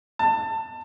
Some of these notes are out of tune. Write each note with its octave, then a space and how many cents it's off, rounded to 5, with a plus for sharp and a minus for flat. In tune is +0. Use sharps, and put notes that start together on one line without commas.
A5 +20